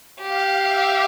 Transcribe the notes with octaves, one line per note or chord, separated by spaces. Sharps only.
G4 F5
E5